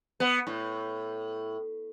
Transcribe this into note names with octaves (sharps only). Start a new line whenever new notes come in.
B3
A2